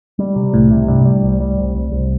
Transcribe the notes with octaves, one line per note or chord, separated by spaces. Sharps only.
G3
C3
C2 A2
C3
G2 G3
G3
C2
G3
C2
C2
C2